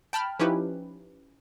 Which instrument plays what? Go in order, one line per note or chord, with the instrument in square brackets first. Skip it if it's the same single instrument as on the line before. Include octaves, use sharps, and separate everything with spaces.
[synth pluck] G5 A5 B5 F6
F3 C#4 D#4 E4 G4 B4